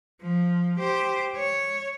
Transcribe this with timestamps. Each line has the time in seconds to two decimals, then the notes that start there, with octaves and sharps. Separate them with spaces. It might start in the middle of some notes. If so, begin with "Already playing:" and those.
0.22 F3
0.79 G4 C5
1.36 C#5